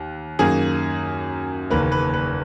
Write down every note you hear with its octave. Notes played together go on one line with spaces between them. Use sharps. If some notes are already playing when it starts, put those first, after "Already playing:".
Already playing: D#2
F#2 D#3 A#3 G#4
F#1 E2 D#3 A#3 B4
B4
B4